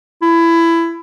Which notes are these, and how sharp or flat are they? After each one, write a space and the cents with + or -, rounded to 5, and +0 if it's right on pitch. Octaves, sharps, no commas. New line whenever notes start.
E4 +20